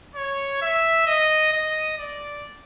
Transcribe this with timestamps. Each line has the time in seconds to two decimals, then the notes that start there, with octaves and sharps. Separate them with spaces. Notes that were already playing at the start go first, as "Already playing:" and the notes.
0.16 C#5
0.62 E5
1.07 D#5
1.52 D#5
1.98 D5